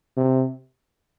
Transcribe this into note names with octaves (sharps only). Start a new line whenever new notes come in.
C3